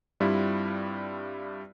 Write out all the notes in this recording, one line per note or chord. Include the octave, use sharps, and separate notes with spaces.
G2 G3 C4 E4 F4